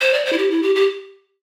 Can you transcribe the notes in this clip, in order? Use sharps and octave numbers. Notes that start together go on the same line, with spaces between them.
C5
D5
C5
E4
G4
E4
G4
G4